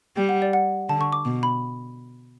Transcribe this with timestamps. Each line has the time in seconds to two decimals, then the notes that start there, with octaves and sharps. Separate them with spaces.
0.17 G3 G5
0.29 F#5
0.42 D5
0.53 F#5
0.89 D3 A5
1.01 C#6
1.13 D6
1.25 B2
1.43 B5